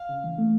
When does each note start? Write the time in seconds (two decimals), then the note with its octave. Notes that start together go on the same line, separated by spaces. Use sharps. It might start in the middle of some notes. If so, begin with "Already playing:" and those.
Already playing: F5
0.09 C#3
0.24 E3
0.38 A3